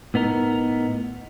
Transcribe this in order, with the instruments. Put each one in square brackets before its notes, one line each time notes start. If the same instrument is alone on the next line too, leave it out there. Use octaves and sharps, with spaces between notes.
[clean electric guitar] A2 B3 D#4 A#4